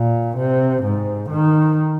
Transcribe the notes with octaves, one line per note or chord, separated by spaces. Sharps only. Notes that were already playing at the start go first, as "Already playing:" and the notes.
Already playing: A#2
C3
G#2
D#3